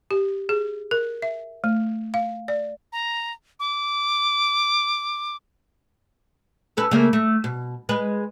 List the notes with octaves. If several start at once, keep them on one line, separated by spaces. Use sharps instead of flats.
G4
G#4
A#4
E5
A3
F5
D5
A#5
D6
C#4 A4 B4
C#3 A3 A#3
A3
B2
G#3 B4